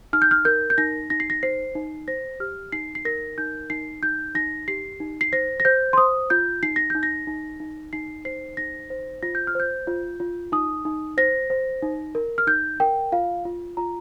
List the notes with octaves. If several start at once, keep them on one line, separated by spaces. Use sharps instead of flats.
D#4 F6
G6
F6
A#4 G6
G6
D#4 A#6
D#4 A#6
C7
A#6
C5 C7
D#4
C5 A#6
G4 F6
D#4 C7
C7
A#4 A#6
D#4 G6
D#4 C7
D#4 G6
D#4 A#6
G4 C7
D#4
C7
C5 A#6
A#6
C5 G6
C6
C5 D#6
F4 G6
D#4 C7
A#6
D#4 G6
A#6
D#4
D#4
D#4 C7
C5 C7
D#4 A#6
C5
F4 A#6
G6
F6
C5 G6
F4
F4
D#4 D#6
D#4
C5 A#6
C5
D#4
A#4
F6
D#4 G6
A#4 G5
F4 F5
F4
F4 A#5